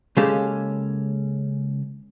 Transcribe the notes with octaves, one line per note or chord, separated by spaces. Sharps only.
C#3 G#3 A#3 C#4 G4 A4